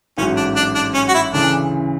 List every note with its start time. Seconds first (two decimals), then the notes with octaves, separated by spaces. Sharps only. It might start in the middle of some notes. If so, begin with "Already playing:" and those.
0.18 A1 G#2 F#3 C#4
0.37 D4
0.56 D4
0.75 D4
0.94 C#4
1.08 F#4
1.14 E4
1.33 D2 C#3 E3 D4